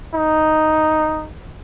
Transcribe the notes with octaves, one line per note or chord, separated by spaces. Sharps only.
D#4